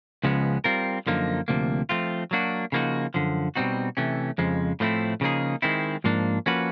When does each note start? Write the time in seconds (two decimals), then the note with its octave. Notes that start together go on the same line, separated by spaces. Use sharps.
0.23 C#2 C#3 F3 G#3 B3
0.64 G3 C4 F4 A#4
1.06 F#2 D3 F3 A#3 D#4
1.48 D2 C3 F3 A#3
1.89 F3 A3 C4 F4
2.31 F#3 A#3 D4 F#4
2.72 C#3 F3 A#3 D#4 F#4
3.14 F#2 D3 F3
3.55 B2 G3 C4 D#4 F#4
3.97 C3 E3 A3 C#4
4.38 F2 C#3 F3 G#3
4.80 A2 F3 A3 C4 E4
5.21 C#3 F3 A#3 D#4 G#4
5.62 D#3 G#3 C4 E4
6.04 G#2 F3 A#3 D4
6.46 F3 A#3 C#4 F#4 B4